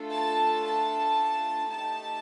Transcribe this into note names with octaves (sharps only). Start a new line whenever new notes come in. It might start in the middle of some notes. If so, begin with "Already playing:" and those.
Already playing: A3 D4 F4 A4
A5
A5
A3 D#4 G4 A5